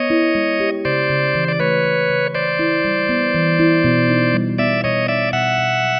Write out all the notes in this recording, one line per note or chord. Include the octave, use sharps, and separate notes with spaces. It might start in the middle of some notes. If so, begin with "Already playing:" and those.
Already playing: B3 C#5 D#5
E4
G#3
G4
C#3 C5 D5
C#3
E3
D5
A3 B4 C#5
C#3
C#3
E3 C5 D5
E4
G3
B3
E3
E4
B2
D#4
G3
B3 D5 E5
B2 C#5 D#5
D#4 D5 E5
B2 E5 F#5
B2
F#3